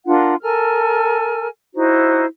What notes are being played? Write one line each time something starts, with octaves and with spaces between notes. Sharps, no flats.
D4 F4 A#4 F#5
A4 A#4 G#5 F6
D#4 E4 F#4 C5